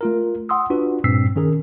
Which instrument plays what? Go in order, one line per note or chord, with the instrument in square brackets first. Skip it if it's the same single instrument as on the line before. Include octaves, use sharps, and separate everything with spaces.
[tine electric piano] A3 F4 A#4
F#5 C6 D#6 E6
D4 F4 F#4 B4
G2 A#2 C4 E6 B6 C7
D#3 C#4 G#4 A#4